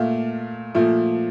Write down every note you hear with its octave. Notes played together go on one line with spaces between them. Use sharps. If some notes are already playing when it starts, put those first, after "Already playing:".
Already playing: A#2 A3 F5
A#2 F3 A3